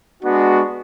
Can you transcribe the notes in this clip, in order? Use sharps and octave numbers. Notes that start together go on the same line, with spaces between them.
G#3 B3 D4 F#4